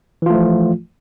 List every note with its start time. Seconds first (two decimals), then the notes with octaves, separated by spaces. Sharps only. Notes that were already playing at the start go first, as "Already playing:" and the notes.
0.22 E3
0.26 F4
0.30 A3
0.34 F3